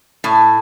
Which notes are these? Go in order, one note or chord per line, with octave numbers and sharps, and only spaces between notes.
A2